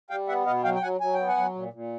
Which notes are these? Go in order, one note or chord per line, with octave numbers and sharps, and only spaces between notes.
G3 F5 G5
B3 E5 F#5
B2 D#5 F5
F#3 F5 G5
G5
F#3 F#5 G#5
F#3 G#5
B3 G5
F#5 G#5
F#3
A#2
A#2